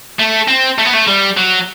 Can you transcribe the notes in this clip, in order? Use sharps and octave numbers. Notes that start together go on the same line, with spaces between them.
A3
C4
A3
B3
A3
G3
F#3